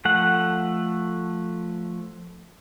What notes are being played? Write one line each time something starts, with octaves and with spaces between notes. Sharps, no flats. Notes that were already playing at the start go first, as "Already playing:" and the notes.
F3 A3 F#5